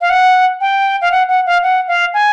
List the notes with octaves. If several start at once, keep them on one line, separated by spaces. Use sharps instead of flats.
F5
F#5
G5
F5
F#5
F#5
F5
F#5
F5
G#5